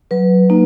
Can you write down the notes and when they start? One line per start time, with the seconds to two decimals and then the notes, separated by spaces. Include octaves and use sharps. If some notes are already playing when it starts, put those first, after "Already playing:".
0.11 F#3 B4
0.50 A#3 D#4